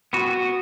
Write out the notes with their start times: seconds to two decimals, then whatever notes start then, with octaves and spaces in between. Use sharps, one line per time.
0.13 B3 F#4